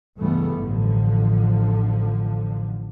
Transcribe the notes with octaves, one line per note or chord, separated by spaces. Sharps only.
C#2 G2 E3 G3 A3 B3
A1 D3 F3